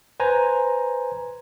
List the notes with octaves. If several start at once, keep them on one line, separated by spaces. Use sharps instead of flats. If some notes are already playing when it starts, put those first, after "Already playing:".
B4 C5 G#5 A#5